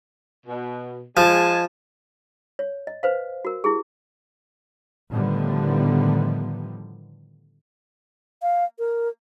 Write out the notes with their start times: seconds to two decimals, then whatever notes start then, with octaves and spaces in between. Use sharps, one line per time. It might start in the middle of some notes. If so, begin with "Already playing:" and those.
0.46 B2
1.17 F3 G#3 G#5 A5
2.59 C#5
2.87 D#5
3.03 B4 C5 F5
3.45 F#4 A#4
3.64 E4 G4 G#4
5.10 A2 D3 D#3 F3 G3 B3
8.42 F5
8.79 A#4